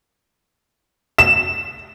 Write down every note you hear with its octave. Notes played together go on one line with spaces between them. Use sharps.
E7